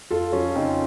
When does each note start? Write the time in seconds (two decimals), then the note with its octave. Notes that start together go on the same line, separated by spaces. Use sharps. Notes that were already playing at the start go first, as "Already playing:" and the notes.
0.11 F2 F4 A4
0.32 F3 C#4 F4
0.56 C#3 C4 D#4